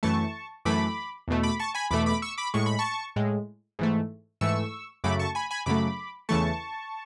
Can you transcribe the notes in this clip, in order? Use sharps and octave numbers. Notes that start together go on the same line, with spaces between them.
F#2 E3 A3 A5 C#6
F#2 E3 A3 B5 D6
E2 B2 A3
B5 D6
A5 C#6
G#5 B5
E2 B2 A3 B5 D6
B5 D6
C#6 E6
B5 D6
A2 G#3 C#6
B5
A5 C#6
A2 G#3
G#2 E3 A3
G#2 E3 A3 C#6 E6
F#2 C#3 F#3 A3 B5 D6
A5 C#6
G#5 B5
G#5 B5
F#2 C#3 F#3 A3 B5 D6
E2 C#3 E3 A3 A5 C#6